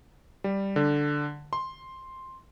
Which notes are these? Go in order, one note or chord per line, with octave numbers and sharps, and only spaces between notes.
G3
D3
C6